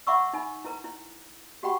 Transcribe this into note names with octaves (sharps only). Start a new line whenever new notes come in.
E5 F#5 B5 C#6 D6 E6
D#4 G#5 B5
E4 A#4 A#5
E4
F#4 G4 F#5 G5 B5 C#6